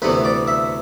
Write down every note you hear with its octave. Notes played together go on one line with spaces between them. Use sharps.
D2 C3 E3 B3 B4
D5
E5